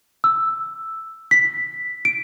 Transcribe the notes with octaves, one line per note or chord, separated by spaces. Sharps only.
E6
B6
D7